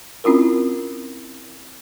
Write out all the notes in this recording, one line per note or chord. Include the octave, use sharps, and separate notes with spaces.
C4 C#4 E4 F4 A#4